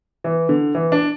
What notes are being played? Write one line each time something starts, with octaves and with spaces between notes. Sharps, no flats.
E3
D3
E3
D4